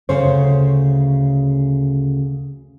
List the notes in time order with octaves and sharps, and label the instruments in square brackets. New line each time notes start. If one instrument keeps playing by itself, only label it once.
[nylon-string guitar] D2 C#3 C5 C#5